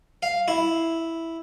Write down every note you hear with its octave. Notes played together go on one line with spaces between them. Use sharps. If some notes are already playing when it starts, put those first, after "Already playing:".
F5
E4